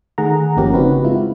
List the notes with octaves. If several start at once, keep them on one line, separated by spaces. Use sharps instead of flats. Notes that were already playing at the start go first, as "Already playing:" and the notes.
D#3 A3 G#4 F#5 A#5
G1 F3 A#3 C#4 G4 A#4
C#3 C4 D#4 F#4 G4 B4
G#3 E4 F4